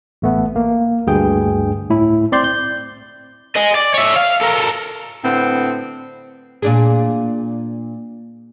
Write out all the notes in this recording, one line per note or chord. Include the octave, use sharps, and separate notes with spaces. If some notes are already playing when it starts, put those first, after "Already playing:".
A1 A3 B3
A#3
D2 G2 G#4 G5
A2 E4
C4 D5 C6 G6
G6
D#5 G#5
D5
C#5 E5
F5
A4 A#4
A2 D3 B3 C4
A#2 D4 G#4